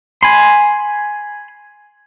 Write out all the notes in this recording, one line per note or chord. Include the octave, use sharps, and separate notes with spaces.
G#5 B5 C6